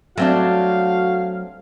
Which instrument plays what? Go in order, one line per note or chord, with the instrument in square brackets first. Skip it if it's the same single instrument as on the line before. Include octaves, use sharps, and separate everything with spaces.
[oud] F#3 [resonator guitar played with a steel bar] A3 C4 D4 [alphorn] F#4 [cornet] F5